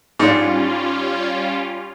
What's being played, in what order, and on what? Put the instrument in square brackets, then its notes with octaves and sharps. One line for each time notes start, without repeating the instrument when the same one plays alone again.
[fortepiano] G#2 D4 [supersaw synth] G3 C#4 F4